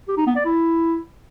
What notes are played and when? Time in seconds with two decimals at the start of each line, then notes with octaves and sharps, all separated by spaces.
0.08 G4
0.17 D#4
0.27 B3
0.36 D5
0.45 E4